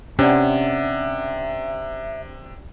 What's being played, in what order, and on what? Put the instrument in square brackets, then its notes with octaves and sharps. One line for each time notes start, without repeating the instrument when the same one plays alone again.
[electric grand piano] C3 [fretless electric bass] C#4 [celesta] D4 D5 F#5 [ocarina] E5